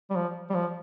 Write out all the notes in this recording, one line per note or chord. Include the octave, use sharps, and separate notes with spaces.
G3
F3
G3
F3